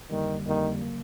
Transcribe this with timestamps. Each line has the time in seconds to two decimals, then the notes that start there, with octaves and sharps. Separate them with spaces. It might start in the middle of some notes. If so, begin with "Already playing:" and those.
0.11 F2 D3 D#3 G3 A#3
0.46 F2 D3 D#3 G3 A#3
0.81 C#3 F#3 A#3